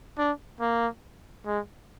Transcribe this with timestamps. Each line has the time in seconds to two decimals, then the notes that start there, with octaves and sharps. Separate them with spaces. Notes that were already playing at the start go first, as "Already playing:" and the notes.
0.18 D4
0.61 A#3
1.46 G#3